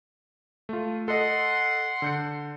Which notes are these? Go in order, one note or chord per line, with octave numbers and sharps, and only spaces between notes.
A3 F4
A4 D#5 F#5 C6
D3 G6 C#7